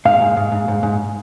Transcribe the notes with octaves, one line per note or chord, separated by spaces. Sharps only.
G#2 F5
G#2
G#2
G#2
G#2
G#2